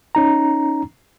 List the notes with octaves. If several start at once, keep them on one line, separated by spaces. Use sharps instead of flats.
C#4 D#4 A#5